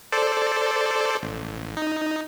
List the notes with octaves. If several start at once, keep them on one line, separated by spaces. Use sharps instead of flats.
A4 C5 D5
A1
D#4